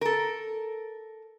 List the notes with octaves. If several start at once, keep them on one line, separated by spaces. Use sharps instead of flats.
A4 A#4